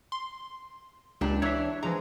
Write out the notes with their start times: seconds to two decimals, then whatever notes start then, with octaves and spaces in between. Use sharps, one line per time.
0.12 C6
1.21 C#2 A#2 G3 D4
1.42 E3 D4 C#5 E5
1.83 E3 F3 G#3 A#5